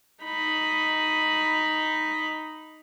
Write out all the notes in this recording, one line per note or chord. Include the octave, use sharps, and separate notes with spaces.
D#4 B5